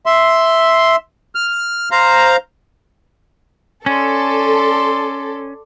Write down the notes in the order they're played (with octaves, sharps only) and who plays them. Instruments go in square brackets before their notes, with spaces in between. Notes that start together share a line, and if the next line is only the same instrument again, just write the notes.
[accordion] E5 C6
F6
C5 F5 A#5
[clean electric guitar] C#4 [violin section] A4 [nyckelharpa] D5 C6